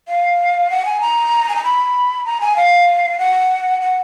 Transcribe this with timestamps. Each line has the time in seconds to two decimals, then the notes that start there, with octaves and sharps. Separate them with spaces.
0.08 F5
0.70 F#5
0.85 G#5
1.01 A#5
1.49 G#5
1.56 A#5
1.64 B5
2.25 A#5
2.41 G#5
2.57 F5
3.19 F#5
3.81 F#5